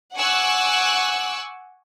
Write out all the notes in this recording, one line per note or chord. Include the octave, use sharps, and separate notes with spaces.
F#5 G#5 C#6 D6 E6 F#6